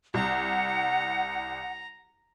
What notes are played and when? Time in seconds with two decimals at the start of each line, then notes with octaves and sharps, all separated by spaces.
0.14 C2 F#5 A#5